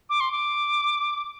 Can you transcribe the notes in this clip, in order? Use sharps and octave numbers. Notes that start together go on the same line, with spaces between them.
D6
C6
D6